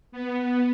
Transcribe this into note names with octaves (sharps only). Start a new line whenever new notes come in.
B3